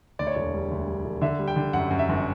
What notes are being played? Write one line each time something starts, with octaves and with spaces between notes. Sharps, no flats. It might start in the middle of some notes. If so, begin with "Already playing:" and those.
D2 D5
C#5
E1 D5
G3
D2
G3
E1
D3 E5
G3
G5
D3
F#2 F#5
F#2
E5
G1